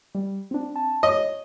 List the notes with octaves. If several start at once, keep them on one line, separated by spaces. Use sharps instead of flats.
G3
C4 D4
A5
C#5 D#5